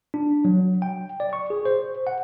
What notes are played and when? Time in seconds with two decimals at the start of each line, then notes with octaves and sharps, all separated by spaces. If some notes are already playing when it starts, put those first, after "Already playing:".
0.14 D4
0.45 F#3
0.82 G5
1.20 D5
1.33 C#6
1.50 G#4
1.65 C5
2.07 F#5